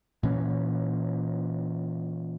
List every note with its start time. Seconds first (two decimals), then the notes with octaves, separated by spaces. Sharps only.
0.23 A#2 E3 C#4